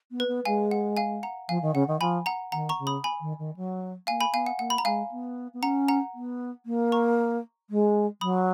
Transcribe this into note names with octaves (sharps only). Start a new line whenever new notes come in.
B3
B4
B3
G#3 F5 G#5
F#5
F5 G#5
F#5 A#5
F3 F5 G#5
D#3
C#3 F#5
D#3
F3 G#5 B5
F#5 A#5
D#3 F#5 A#5
A#5 C#6
C#3
B5 D#6
G#5 B5
D#3
D#3
F#3
A#3 F5 G#5
G#5 B5
B3 F5 G#5
F#5
A#3 F#5
B5
A#5
G#3 F5 G#5
B3
B3
C#4 F#5 A#5
F#5 A#5
B3
A#3
A#5 C#6
G#3
F#3 B5 D#6